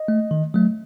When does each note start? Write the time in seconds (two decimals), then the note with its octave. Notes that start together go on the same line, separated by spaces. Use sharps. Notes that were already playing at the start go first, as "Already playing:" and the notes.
Already playing: D#5
0.08 A3
0.31 D#3
0.54 F#3 A3